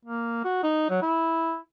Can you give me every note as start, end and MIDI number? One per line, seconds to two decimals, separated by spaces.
0.05 0.41 58
0.44 0.60 66
0.63 0.89 63
0.90 0.99 54
1.02 1.57 64